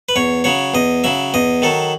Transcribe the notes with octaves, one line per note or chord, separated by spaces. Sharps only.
B4
E2 C#5
C#3 F#3 C#5
E2 D#5
C#3 F#3 E5
E2 D#5
D#3 F#3 A4